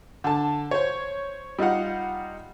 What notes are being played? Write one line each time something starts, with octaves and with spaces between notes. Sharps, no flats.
D3 A5
C5 C#5
G3 D#4 F4 F5 F#5